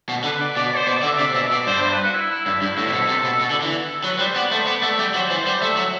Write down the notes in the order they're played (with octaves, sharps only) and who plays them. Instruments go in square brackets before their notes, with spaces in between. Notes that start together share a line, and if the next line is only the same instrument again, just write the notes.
[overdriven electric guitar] B2
[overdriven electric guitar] D3 [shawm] B4
[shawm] D5
[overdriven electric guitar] B2 [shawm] D5
[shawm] D5
C5
[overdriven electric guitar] B2 [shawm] D5
[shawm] D5
[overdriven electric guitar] D3
[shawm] E5
[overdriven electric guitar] C3 [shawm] D5
[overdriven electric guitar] B2 [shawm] E5
[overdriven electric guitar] B2 [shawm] D5
[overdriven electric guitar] G2 [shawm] C5
[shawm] C5
B4
F#4
E4
E4
[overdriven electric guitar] G2 [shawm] E4
[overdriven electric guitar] G2 [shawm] E4
[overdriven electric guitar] A2 [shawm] E4
[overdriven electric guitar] C3
[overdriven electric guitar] B2 [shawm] A4
[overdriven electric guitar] C3
B2
B2
D3
E3
[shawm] A4
[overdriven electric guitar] F#3 [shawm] B4
[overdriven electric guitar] G3 [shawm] C5
[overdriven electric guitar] B3 [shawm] D5
[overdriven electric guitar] A3 [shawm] C5
[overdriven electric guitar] B3 [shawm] D5
[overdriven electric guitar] A3 [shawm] E5
[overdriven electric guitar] G3 [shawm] D5
[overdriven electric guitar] F#3 [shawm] C5
[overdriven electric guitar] E3 [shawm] C5
[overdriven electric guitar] G3 [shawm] C5
[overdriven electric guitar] A3 [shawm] E5
[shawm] E5
[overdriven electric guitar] F#3
[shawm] E5